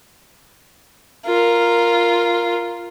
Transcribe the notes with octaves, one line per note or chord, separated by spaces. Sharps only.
F4 A#4